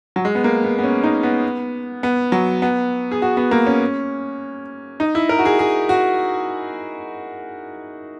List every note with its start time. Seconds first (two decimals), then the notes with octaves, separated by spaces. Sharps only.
0.16 F#3
0.25 G#3
0.35 B3
0.44 A#3
0.64 B3
0.79 B3
0.84 C#4
1.04 D#4
1.23 B3
2.03 B3
2.32 F#3
2.62 B3
3.11 G#4
3.22 F#4
3.37 B3
3.51 A#3
3.67 C#4
5.00 D#4
5.15 E4
5.29 A#4
5.39 F#4
5.45 G#4
5.59 G#4
5.89 F#4